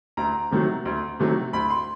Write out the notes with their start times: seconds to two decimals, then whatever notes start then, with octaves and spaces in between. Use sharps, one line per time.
0.17 D2 A#5
0.51 C3 D#3 F#3 A3
0.85 D2
1.19 C3 D#3 F#3 A3
1.53 D2 B5
1.70 C6